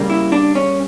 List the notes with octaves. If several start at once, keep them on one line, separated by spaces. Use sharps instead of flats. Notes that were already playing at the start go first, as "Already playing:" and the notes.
Already playing: C#3 G3 A#3
E4
D4
C#4